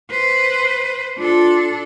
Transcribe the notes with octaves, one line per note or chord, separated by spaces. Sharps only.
B4 C5
D4 F4 A4